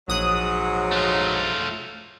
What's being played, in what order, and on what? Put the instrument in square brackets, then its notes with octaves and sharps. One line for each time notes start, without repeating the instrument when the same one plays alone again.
[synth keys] A#1 D#6 F#6 [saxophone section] G#2 F#3
[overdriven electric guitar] A3 F4